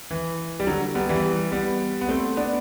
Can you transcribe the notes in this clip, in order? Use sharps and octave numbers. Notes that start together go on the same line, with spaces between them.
E3
G3
D3 F#3
G3 B3
E3 G3
G3 B3
B3
A3 C4
B3 D4